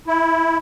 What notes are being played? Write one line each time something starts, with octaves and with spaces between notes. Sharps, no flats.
E4